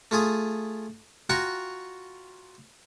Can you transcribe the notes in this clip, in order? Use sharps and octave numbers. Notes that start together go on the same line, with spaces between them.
A3 F4 G#4 D#6
F4 F#4 F#5 G5 A#5 C#6